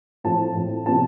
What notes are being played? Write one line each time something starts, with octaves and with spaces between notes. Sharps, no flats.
A2 F3 C4 A5
A2 F3 C4
C3 F3 B3 A5